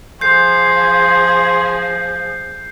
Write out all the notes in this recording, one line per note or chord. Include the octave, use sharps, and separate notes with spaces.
F3 G#4 C6 G6 C7